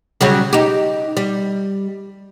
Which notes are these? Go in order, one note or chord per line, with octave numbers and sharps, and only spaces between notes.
C#3 F#3 G3
D#4 G4
G3